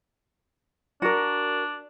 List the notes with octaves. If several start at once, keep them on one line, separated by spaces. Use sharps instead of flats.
D4 F#4 A#4